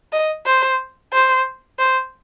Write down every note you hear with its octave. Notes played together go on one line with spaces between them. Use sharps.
D#5
C5
C5
C5